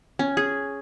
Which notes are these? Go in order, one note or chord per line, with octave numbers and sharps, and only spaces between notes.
C#4
G#4